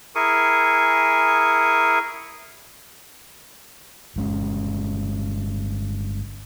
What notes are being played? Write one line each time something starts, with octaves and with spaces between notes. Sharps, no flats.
E4 G#4 A#4 G#5 C#6
G1 G#3 C#4